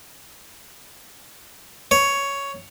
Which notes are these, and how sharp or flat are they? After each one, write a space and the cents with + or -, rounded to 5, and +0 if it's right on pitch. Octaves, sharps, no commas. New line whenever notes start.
C#5 +10